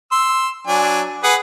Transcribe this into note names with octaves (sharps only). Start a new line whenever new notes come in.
C6 E6
F#3 D4 G#5
G#4 B4 F#5